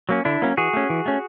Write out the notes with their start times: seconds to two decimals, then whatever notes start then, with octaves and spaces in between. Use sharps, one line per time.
0.09 F#3 A#3 C#4
0.25 D3 D4 E4
0.42 F#3 A#3 C#4
0.57 E3 F#4 G#4
0.73 A3 C#4
0.90 E3
1.06 A3 C#4